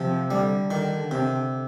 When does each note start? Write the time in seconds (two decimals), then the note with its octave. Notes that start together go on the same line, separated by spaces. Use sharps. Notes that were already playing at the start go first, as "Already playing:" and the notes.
Already playing: C3 F3
0.30 D3 G3
0.71 D3 D#3
1.11 C3